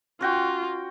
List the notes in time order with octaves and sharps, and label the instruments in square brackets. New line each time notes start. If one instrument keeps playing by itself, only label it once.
[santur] C#4 F#4 G5 [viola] F4